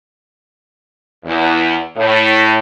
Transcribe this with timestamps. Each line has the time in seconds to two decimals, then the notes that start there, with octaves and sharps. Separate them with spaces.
1.25 E2
1.97 A2